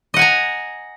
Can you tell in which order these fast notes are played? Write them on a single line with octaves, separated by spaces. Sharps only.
D#5 F#5 G#5 A#5